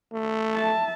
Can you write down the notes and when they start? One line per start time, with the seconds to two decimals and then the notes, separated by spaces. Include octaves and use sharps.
0.13 A3
0.54 E5 A5